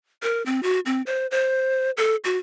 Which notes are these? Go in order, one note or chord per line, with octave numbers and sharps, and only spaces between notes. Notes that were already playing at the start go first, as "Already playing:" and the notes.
A#4
C4
F#4
C4
C5
C5
A4
F#4